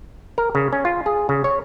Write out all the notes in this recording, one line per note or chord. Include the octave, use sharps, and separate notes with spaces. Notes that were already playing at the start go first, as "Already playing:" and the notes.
A#4
C#3
C#4
F4
G#4
C#3
C#5